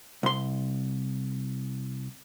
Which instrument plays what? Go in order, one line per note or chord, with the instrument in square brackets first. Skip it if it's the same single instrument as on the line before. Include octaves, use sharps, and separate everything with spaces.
[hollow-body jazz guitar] C2 C6